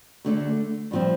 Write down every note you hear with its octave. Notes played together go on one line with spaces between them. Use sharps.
D2 D3 A3
G2 F3 C4